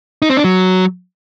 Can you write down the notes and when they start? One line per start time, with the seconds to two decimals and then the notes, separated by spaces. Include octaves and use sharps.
0.22 D#4
0.30 C4
0.37 D4
0.44 F#3